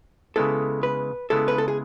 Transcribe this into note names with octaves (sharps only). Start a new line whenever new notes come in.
C#3 G#3 B3 E4 A4
B4
C#3 G#3 B3 E4 A4
B4
A4
G#4